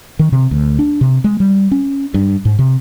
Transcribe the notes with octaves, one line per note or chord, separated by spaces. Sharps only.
D#3
C3
D2
D4
C3
G#3
G3
C#4
G2
G#2
C3